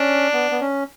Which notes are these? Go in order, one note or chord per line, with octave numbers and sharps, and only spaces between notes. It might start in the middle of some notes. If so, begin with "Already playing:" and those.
Already playing: C#4 D4
B3
B3
C#4